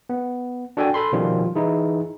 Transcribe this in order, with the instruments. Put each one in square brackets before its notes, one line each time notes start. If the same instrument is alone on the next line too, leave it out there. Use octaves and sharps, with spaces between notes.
[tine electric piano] B3
D4 F#4 A4 D5 G5 G#5
A4 B5 C6
B2 D#3 F3 G3 C#4 F4
E3 D#4 E4 G#4